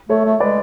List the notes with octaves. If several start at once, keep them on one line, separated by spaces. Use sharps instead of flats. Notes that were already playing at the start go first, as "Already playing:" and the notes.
A3 A4 C#5
A3
G#3 B4 D5